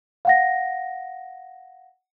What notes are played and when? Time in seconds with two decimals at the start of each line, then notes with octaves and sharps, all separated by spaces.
0.25 F5 F#5 A#6